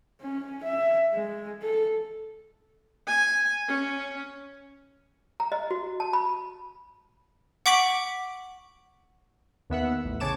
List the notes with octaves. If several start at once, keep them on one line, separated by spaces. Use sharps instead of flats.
C#4
E5
G#3
A4
G#5
C#4
A#5
D#5
F#4
A5
B5
F#5 C#6 D6 B6 D7 F#7
D#2 B3 E5 F#5
A1
C#3 C#5 A5 D6 E7